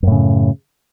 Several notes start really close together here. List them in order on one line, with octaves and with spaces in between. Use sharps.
F#2 A2 C#3